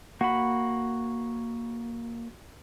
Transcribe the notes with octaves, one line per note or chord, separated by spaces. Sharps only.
A#3 F#4 B5